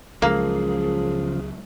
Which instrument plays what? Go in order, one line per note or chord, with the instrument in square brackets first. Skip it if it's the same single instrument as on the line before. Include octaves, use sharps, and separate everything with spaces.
[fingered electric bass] C#2 F#3 G#3 [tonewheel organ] C#3 F3 [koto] A#3 [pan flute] G#4